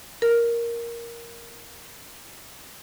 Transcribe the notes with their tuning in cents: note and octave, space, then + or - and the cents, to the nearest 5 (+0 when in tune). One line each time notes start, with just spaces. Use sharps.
A#4 +5